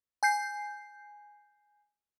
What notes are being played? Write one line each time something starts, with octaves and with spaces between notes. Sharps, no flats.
G#5 G6 C7